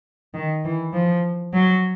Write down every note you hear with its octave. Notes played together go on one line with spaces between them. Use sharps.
D#3
E3
F3
F#3